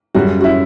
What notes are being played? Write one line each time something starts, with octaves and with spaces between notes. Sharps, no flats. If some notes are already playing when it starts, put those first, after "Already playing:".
F#2 C#3 G3 F#4
F#4
E4